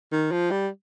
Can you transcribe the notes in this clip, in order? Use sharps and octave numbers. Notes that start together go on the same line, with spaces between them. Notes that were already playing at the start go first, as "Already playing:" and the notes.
D#3
F3
G3